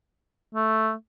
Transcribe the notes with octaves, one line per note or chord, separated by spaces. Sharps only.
A3